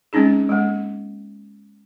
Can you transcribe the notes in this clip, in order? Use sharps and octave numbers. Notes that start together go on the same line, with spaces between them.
G#3 C4 C#4 D#4 G#4
G#3 A#3